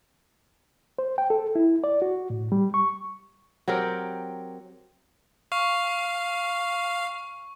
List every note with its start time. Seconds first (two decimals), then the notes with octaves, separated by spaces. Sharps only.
0.99 C5
1.18 G5
1.30 A4
1.55 E4
1.84 D5
2.02 F#4
2.30 A2
2.52 G3
2.74 C#6
3.68 F#3 C4 G4 A#4
5.52 F5 C#6